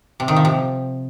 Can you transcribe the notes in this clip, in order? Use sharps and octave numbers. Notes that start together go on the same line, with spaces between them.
C3
D#3
F3
C3